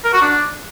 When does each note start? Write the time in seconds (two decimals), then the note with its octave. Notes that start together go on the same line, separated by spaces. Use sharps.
0.05 A#4
0.13 F#4
0.21 D4